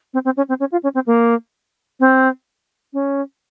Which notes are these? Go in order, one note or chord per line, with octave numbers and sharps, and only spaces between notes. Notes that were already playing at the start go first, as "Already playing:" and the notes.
C4
C4
C#4
C4
C#4
F4
C#4
C4
A#3
C4
C#4